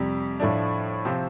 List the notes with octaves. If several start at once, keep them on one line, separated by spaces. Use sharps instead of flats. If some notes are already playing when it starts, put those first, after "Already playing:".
Already playing: F2 C3 G3
A2 F3 A3 D4
C3 F3 C4